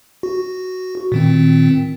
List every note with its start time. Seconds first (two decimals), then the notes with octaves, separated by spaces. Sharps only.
0.23 F#4
1.12 A#2 D#3 C4